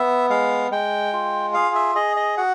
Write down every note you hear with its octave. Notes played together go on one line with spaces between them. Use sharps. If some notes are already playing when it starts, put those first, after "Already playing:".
Already playing: B3 E5
G#3 F5
G#3 G5
F4
G#4 F5
E5
G#4 D#5
D#5
F#4 F#5